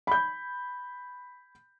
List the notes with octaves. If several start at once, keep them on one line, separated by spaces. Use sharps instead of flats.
B5 G6